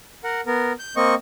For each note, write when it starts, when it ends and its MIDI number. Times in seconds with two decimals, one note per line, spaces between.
0.24 0.41 70
0.24 0.41 78
0.47 0.73 59
0.47 0.73 70
0.79 0.95 91
0.96 1.15 58
0.96 1.15 60
0.96 1.15 75
0.96 1.15 85